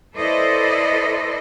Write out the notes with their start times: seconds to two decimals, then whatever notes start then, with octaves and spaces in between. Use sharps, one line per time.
0.16 E4 A4 B4 C5 D5 D#5